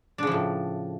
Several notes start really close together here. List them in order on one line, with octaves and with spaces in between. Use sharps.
D4 C#3 F3 A2